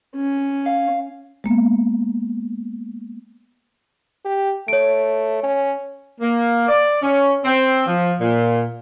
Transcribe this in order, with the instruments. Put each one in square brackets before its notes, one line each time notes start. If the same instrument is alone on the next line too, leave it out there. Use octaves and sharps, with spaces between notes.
[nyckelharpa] C#4
[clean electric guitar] F5
[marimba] G#3 A#3 B3
[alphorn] G4
[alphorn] A3 [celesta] C#5 D7
[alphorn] C#4
[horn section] A#3
D5
C#4
C4
F3
A#2